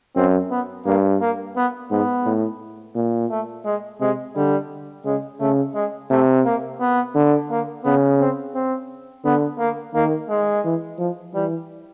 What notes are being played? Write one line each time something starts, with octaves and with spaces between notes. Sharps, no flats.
F#2 C4
B3
G2 A#3
A#3
B3
G#2 B3
A2
A#2
A3
G#3
C3 G#3
D3 G3
C#3 G#3
C#3 A3
G#3
C3 A3
A#3
B3
D3
A#3
C#3 B3
C4
C4
D3 B3
A#3
D#3 A#3
G#3
E3
F3
E3 G3